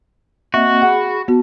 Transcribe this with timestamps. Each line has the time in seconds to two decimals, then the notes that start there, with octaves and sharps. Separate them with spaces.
0.54 A#3 C4 F#4 D#5 E5
0.82 G#4 F#5 B5
1.28 B3 F#4 A5